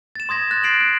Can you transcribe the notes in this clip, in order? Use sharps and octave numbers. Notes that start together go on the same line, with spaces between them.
A6 E7
C6 D#6 G#6 A#6
F#6 A6 A#6
A6 C7 D7 F#7
F#6